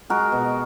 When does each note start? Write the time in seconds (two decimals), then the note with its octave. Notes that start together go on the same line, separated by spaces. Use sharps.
0.10 G#3 F#4 A#4
0.32 B2